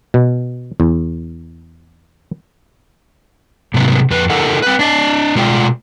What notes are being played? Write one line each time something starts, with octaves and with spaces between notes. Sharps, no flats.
B2
E2
G#2 C3 F#3 B3 D#4
F2 B4
E4 G4 A4 A#4 D#5 F#5
C4 B4
D4 D5 D#5
B2 G#3 F4 D5 G5